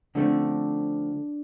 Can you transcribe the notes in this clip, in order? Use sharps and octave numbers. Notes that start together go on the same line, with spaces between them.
D3 F3 A3 C4 D4